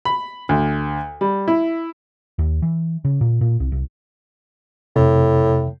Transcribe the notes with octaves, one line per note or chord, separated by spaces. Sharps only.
B5
D2
G3
E4
D#2
E3
C#3
A#2
A#2
C2
C2
F2 A2 C3